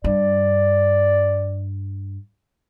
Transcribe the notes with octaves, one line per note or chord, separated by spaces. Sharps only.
G2 D5